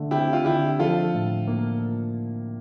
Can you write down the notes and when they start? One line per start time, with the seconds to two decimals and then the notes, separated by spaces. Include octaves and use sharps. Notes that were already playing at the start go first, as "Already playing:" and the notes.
Already playing: D3 A3
0.11 C4 E4 G4
0.33 F4
0.45 D3 E4 G4
0.79 F3 F4 A4
1.14 A2
1.48 A#3